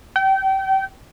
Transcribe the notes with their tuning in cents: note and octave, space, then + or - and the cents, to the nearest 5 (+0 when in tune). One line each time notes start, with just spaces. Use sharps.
G5 -30